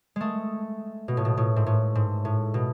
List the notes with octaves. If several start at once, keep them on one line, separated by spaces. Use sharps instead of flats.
G#3 A3
B2
A2
B2
A2
G#2
A2
G#2
A2
B2